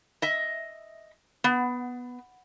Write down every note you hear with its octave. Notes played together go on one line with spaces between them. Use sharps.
D#5 E5
B3